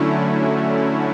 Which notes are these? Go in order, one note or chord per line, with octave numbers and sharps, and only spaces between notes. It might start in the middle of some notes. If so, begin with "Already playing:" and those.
Already playing: D3 F#3 A3 C#4 E4